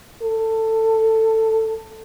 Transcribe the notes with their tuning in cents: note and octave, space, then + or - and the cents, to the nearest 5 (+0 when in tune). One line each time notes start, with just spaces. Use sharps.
A4 +15